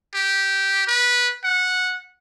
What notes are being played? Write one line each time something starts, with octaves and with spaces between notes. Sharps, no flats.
G4
B4
F#5